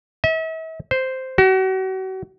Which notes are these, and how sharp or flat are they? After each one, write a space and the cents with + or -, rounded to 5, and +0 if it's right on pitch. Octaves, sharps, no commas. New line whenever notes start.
E5 -40
C5 -5
F#4 +35